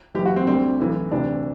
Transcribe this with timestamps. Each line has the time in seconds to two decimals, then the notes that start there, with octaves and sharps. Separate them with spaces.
0.14 F#1 F#2 E3 G4
0.26 F#4
0.36 C4
0.47 D2 D3 G3 C4
0.79 B1 A2 E3
1.11 D2 C3 E3 D4